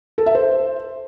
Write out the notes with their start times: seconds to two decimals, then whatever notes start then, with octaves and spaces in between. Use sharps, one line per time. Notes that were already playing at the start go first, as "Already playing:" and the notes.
0.18 A4
0.26 E5
0.35 C5